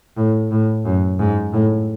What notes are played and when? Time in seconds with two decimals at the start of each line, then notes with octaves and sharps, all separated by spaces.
0.17 A2
0.51 A2
0.85 F#2
1.19 G#2
1.53 A2